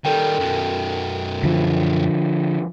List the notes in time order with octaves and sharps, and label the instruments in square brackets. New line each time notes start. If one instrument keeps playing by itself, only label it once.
[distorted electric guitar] D#3 G3 [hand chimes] A4 A#4 G5
[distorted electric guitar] F#2 B2
[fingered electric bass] D3 F3